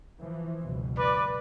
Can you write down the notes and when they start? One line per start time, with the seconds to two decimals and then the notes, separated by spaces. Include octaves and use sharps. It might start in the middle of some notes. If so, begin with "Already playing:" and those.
0.21 E3 F3
0.60 F#1 C#2 B2
0.97 B4 D5